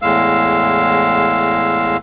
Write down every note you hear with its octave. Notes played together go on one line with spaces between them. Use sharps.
E2 A2 G#3 F5 E6